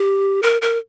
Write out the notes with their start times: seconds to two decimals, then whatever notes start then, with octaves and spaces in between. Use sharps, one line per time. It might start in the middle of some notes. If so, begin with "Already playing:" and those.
Already playing: G4
0.42 A#4
0.62 A#4